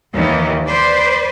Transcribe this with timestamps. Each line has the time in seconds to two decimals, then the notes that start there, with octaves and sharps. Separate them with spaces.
0.13 D#2 D#3 E3
0.66 B4 C5 D5